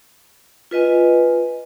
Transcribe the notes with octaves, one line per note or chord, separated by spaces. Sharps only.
F4 B4 D#5 G#5